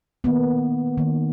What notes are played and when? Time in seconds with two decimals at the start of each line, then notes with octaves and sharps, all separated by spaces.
0.24 D#3 A#3 B3
0.98 D#3 A#3